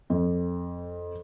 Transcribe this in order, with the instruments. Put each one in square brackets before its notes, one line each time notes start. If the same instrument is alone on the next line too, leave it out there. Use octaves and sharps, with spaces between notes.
[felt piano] F2